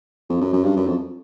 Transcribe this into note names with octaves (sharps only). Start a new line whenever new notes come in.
F2
F#2
F#2
G2
F#2
F2